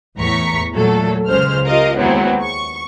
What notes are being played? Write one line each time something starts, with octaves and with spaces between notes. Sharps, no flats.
E2 A2 A#5 C#6 B6
A#2 F#3 A3 A4
C#2 C#3 G#3 C5 F6
F4 G4 A#4 D#5 F5
D#2 E3 F#3 G#3 B3 C4
C#6